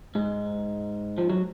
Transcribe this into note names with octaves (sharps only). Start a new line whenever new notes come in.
G#2 G#3
F3
F#3